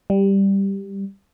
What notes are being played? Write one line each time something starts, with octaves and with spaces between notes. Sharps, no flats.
G3